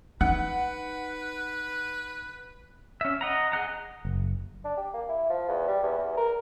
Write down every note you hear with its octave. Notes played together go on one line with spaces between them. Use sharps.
D#4 B4 F#5
C#4 E5
D#5 F#5 A#5
G#4 D#5 F#5 A#5
F#1
D4
G4
A#3
E4
F3
E2
G3
E2
E2
A#4